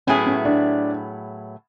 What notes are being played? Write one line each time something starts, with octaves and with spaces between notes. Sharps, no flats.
A2 F#3 B3 C#4 E4 G#4
C#4
D4